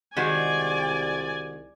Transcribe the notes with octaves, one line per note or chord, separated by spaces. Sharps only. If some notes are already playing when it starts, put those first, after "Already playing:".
C2 D#3 G#3 F#4 D5 G#5